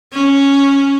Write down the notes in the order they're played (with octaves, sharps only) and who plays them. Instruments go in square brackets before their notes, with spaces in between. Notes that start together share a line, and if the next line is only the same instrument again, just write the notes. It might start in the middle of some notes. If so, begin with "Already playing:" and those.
[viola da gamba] C#4